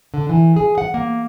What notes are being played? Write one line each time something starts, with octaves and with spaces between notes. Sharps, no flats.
D3
E3
G#4
F#5
A#3